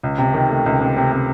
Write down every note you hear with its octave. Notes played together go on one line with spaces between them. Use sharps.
C#2
C3
D#3
A3
C#2
C3
C3
C3